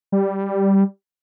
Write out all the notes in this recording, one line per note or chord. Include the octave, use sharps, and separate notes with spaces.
G3